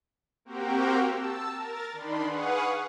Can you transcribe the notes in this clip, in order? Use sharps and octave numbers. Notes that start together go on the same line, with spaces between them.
A#3 C4 F#4 G4 A#4 G5
A5 E6
A#4 A6
D#3 D4 B5 C6
G#4 B4 F5 F#5 C#6 D#6